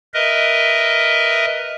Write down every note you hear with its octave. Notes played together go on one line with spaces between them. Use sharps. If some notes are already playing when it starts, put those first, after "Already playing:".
A#4 B4 D#5 E5